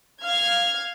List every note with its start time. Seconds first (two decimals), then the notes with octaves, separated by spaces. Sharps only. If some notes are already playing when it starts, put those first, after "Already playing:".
0.22 F5 F6 G#6